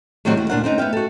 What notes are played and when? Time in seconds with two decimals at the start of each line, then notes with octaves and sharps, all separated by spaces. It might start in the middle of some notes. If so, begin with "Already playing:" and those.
0.25 A2 D#3 F#3 G3 C4 F#5
0.37 D#2 F#4
0.50 D2 A#2 D4 F4 A#4 F#5
0.64 C4 C#4 D#4
0.78 B3 E5 F5 G5
0.93 F#4 A4